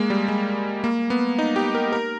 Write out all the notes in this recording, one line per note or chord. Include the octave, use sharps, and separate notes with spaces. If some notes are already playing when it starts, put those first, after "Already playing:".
Already playing: G#3 A#3
G3
G#3
A#3
B3
D#4
G4
A#4
A#4